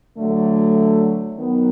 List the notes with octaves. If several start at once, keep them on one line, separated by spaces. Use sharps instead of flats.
D3 F#3 A3
D#3 F#3 B3